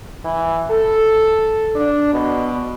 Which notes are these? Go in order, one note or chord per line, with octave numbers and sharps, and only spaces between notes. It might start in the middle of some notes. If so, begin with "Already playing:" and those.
E3
A4
D4
B2